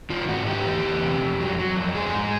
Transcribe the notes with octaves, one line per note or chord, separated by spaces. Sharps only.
D#3 F4
G#2 F#4
D#3 G4
E2
E2
C3
F2
F#3
F#3
F2
G#3 G#4
G#2